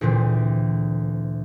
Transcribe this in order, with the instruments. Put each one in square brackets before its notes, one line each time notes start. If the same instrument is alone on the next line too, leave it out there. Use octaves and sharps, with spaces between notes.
[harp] D2 A#2 E3 C4